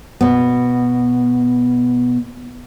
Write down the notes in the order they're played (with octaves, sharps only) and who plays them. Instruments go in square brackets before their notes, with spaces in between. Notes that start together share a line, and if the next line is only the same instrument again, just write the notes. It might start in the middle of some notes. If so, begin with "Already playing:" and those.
[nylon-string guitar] B2 B3